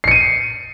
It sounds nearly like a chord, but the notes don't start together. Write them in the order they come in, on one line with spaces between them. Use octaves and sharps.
C7 C#7 D#7